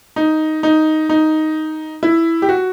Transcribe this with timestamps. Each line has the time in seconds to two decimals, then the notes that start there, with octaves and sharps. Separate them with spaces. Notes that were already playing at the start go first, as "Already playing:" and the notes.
0.16 D#4
0.63 D#4
1.09 D#4
2.03 E4
2.42 G4
2.49 F#4